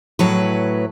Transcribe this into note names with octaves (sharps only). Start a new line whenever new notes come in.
A2 F#3 B4